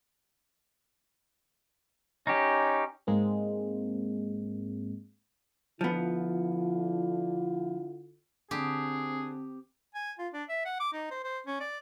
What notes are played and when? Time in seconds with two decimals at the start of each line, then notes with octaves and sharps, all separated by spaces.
2.27 C#4 D#4 G4
3.07 G#2 G#3 A#3 C4
5.81 D3 F3 B3 E4 F4
8.51 D3 C4 G4 G#4 D#6
9.95 G#5
10.19 F4
10.33 D4
10.49 E5
10.65 F#5
10.80 D6
10.93 D#4
11.11 C5
11.24 C5
11.47 C#4
11.60 D5